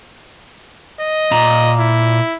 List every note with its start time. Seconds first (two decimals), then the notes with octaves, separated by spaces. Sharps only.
1.00 D#5
1.31 A#2 A#5
1.79 E4